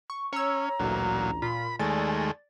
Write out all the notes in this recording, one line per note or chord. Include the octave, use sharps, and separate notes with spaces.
C#6
C#4 C#5 A#5 E6
A1 D2 A#2 F#3
A#2 F4 B5
D#2 G#3 A3 D5 G#5 A6